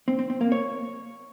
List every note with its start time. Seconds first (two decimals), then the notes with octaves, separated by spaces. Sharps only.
0.08 C4
0.19 C4
0.30 C4
0.41 A#3
0.52 C#5